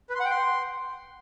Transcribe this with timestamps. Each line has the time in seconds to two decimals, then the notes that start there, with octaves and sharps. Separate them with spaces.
0.10 B4
0.15 C6
0.20 F#5
0.25 G5
0.30 C6